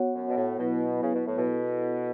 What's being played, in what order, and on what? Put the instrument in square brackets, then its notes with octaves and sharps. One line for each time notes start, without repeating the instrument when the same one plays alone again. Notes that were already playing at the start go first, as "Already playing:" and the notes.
Already playing: [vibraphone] B3 F#4 C#5 F#5
[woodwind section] F#2
B2
A2
[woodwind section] B2 [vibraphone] F#3 B3 E4 B4
[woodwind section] C#3
B2
A2
B2
[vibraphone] B3 E4 A4